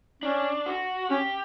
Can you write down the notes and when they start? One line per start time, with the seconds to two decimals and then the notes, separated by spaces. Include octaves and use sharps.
0.23 C#4 D4
0.66 F#4
1.10 C#4 G4